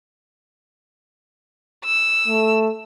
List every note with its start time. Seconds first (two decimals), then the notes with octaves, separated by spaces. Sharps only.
1.85 E6
2.28 A3